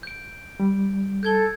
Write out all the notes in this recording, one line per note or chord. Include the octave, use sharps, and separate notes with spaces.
G6 D7
G3
A4 G6 G#6 G7